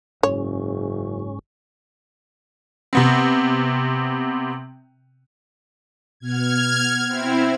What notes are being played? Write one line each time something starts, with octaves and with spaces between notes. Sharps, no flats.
F#1 G#2 C#4 C#5
C3 B3 C4
B2 B3 F#5 F6 G#6
C4 E4 C5 F#5 F6